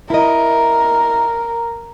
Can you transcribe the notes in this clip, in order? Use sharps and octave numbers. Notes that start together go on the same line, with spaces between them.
E4 A#4 D#5